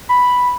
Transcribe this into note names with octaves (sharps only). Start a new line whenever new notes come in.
B5